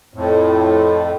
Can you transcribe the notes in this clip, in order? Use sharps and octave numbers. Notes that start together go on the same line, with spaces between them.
F2 A2